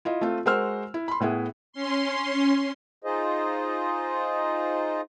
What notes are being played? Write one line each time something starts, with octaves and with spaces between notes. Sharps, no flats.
E4 F4 D#5
A3 C4 F4
G#3 F#4 A#4 C5 E6 F6
E4
B5 C6
A2 B3 E4 G#4
C#4 C6
D#4 F4 G#4 C5 D#5